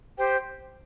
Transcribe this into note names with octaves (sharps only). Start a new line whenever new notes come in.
G4 C5 G5